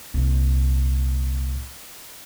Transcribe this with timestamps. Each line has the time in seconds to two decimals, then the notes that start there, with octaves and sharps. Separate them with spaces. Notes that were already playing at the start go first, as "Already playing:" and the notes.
0.14 C2 A#2